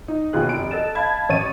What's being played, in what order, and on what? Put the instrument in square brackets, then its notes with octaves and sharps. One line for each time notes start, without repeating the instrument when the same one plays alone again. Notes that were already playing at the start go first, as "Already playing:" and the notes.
[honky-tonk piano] D#4
G1 D#2 B2 F4 G#4 F#6
F1 D7
A4 D#5 A6 E7
D#5 F5 A5 B5 G#6
A1 C#5 A6 D#7